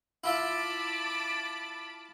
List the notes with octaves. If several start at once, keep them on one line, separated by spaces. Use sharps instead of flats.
E4 F4 E5 A5 B5 D6